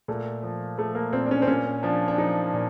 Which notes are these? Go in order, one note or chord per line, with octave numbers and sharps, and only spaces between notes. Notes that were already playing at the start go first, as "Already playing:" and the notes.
A#2 A3
F3
F3 A3
A#3
A#2 C4
D4
C#4
C4
A#2 C#4
F3 D4
D4
F3 D#4
A#2